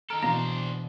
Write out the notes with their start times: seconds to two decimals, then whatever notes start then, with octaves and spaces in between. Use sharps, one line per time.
0.10 D#3 A4 A#5 F6 D7
0.22 B2 E3 D4 C5 F5 A#5 A#6